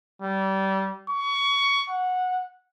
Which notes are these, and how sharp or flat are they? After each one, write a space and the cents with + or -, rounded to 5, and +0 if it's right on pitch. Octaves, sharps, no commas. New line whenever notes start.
G3 -25
C#6 +20
F#5 -15